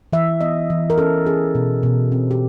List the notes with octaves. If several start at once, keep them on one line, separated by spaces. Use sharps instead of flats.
E3 E5
B3 D#5
E3
A#4
C#4 A4
C#4 G#4
B2
B2
C4
G4